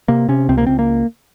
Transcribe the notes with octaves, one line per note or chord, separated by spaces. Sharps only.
C3 A#3
C3 C#4
C#2 C4
A#3
C#2 C4
A#3